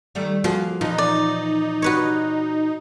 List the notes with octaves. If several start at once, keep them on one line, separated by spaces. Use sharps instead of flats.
D#3 G3 A3
F3 A#3 F#4 G#4
A#2 E3 F3 D#4
D5
F#4 B4 C#5